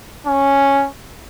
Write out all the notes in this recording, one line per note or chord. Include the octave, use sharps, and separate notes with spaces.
C#4